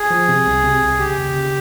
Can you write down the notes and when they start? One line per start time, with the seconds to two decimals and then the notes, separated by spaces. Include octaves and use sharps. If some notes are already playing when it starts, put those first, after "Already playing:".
Already playing: G#4
0.10 F3
0.29 C3
0.46 C2
0.64 C3
0.82 C2
0.99 C#3 G4
1.17 D#2
1.34 C#3